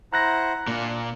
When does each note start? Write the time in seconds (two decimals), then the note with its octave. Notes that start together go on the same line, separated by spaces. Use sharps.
0.13 E4 C5 F#5 A#5 F#6 A#6
0.67 A#2 D4